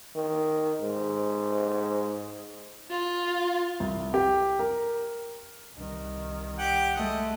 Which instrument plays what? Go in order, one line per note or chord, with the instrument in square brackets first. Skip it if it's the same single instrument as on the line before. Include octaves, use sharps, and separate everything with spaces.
[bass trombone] D#3
G#2
[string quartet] F4
[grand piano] C2
G4
A#4
[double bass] C2 D#3
[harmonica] G4 F#5 G5
[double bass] G#3 A3 [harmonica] D#5